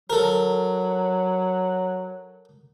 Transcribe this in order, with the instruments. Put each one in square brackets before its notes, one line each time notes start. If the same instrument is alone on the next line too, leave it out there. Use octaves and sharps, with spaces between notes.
[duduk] F#3 [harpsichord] A4 A#4